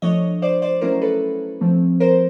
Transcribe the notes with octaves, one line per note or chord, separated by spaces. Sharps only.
F3 A3 D4 C#5 D#5
C5 D5
C5 D5
F#3 A3 C#4 E4 A#4 C5
A4 B4
F3 A3 C4
A#4 C5